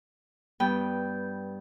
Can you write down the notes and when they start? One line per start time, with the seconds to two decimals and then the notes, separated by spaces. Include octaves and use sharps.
0.60 G2 B3 G5